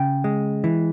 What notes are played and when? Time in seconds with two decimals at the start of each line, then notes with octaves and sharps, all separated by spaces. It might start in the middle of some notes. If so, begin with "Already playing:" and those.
Already playing: C#3 G5
0.24 G#3
0.64 E3